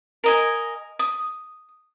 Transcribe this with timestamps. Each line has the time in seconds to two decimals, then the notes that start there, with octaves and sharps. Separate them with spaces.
0.24 A#4 D#5 G#5
0.99 D#6